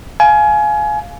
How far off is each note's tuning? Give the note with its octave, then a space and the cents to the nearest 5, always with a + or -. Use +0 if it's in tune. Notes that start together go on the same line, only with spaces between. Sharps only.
F5 +0 G#5 +25